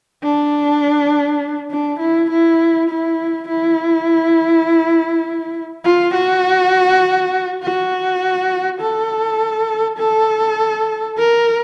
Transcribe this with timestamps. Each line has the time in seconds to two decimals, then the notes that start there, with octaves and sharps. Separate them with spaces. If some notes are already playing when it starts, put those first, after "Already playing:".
0.23 D4
1.71 D4
1.99 E4
2.30 E4
2.89 E4
3.48 E4
5.84 F4
6.14 F#4
7.63 F#4
8.81 A4
9.98 A4
11.17 A#4